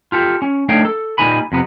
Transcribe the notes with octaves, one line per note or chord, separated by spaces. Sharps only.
F4 G4 A4
C#4
A3 D4 D#4 C#5 F5 G5
A4
A#2 G3 D#4 G#5 B5
F2 C3 B3